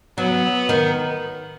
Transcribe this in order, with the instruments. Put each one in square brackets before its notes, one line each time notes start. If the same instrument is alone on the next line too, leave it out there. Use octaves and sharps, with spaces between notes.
[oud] F#3 [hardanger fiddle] B3
[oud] D#3